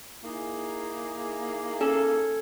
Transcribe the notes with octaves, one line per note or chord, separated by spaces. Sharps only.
A#3 D#4 E4 G#4
C#4 A4